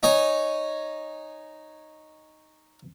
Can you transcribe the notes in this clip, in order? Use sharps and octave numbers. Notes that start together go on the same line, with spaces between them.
D#4 C#5 D#5 G#5